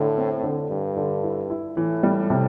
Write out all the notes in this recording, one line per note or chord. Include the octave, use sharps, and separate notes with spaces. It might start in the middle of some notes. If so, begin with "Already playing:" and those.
Already playing: A2 D3
C4
D3
G2 D3
D3
E4
E4
A2 E3
G3
C3